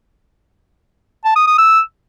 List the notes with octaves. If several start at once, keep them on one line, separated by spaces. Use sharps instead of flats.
A5
D#6
D#6
E6